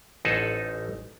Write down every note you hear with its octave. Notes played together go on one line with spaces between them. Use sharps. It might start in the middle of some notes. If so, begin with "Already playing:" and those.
A1 D#4 A4 C5 F#5 G#5